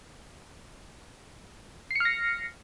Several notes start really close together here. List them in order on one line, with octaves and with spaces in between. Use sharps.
C7 C#7 F6 A#6